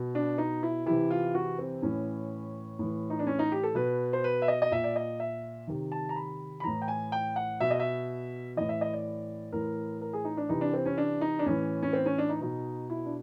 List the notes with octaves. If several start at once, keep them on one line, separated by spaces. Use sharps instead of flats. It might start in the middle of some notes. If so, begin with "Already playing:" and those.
Already playing: B2
D4
D#4
E4
C3 E3 E4
F4
F#4
C4
A2 E3 C#4
A2 E3
D#4
D4
C#4
D#4
G4
A4
B2 B4
C5
B4
E5
D#5
D#5
A#2 E5
D5
D#5
E5
C3 D#3
A5
A#5
B5
B5
A2 E3 A#5
G5
G#5
G5
F#5
B2 E5
D#5
E5
A2 E3 D#5
E5
D#5
D5
A2 E3 A#4
A#4
G#4
D#4
D4
C3 E3 D#4
D4
C4
C#4
D4
D#4
D4
A2 E3 C#4
C#4
C4
C#4
D4
D#4
B2 D#4
E4
D4